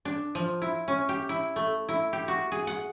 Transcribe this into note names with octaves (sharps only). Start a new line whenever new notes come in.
D4
F3
E4
C#4
G4
E4
A3
E4
G4
F#4
G#4
F#5